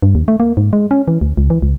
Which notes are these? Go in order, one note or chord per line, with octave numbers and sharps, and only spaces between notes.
G2
D#2
A3
A#3
G#2
G#3
C#4
E3
D2
C#2
E3
C#2